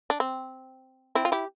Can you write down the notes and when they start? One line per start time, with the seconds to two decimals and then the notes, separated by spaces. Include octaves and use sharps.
0.10 D4
0.20 C4
1.15 C4 E4
1.25 F4
1.32 E4 G4